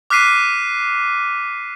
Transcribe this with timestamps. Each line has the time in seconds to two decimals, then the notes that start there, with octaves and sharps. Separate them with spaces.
0.10 D6 F6 F#6 B6 C7 D#7